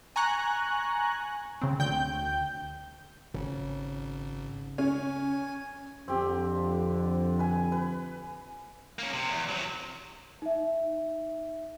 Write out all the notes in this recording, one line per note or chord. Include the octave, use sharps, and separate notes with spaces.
G#5 A#5 C#6 F#6
C#3 C4
D2 G5 G6
G#1 C#3
C#4 G#5
F2 D3 C4 G4
B4 G#5
B4
A#3 C#4
C3
E2
C3 F#3
D#4 E5